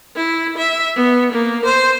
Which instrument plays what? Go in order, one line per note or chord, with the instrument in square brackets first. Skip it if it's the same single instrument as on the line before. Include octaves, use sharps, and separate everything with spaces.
[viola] E4
E5
B3
A#3
C5